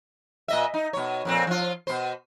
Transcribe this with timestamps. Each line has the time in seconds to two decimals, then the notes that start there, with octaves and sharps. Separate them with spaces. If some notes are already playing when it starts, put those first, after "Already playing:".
0.48 A#2 D#5 E5
0.74 D#4
0.93 B2 C#5
1.25 F2 A#2 C4
1.47 F3 F4
1.87 B2 C5